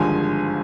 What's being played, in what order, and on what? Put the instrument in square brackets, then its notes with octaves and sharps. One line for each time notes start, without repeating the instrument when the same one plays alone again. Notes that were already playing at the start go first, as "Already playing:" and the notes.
Already playing: [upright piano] G#1 G2 D3 F3 G#3 G#5